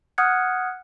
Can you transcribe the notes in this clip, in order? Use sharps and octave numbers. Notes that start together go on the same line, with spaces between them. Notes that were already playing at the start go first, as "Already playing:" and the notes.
F#5 D#6 F6 F#6 G#6 C#7